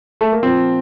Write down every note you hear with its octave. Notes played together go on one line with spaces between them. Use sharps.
A3
A#3
A#2 F3 C4